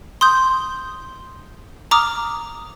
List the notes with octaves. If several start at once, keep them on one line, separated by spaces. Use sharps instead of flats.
C6 D#6 G6
A#5 D6 D#6 F6